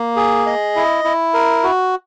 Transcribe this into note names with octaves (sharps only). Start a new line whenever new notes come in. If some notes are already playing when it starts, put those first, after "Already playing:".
Already playing: A#3
G#4
D#5
E4
E4
A#4
F#4